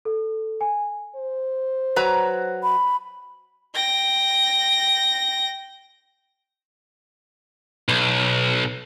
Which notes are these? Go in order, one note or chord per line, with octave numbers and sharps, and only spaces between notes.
A4
G#5
C5
F#3 B4 A#5
B5
G5 A#6
B1